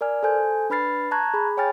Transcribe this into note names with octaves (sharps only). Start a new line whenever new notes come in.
A#4 D5 G#5 F6
A4 C5 G#5 G6
D4 B4 B5 F6 A6 C7
A5 A#5 C#6 F#6 G#6
G#4 B5
C#5 G5 G#5 F6 A6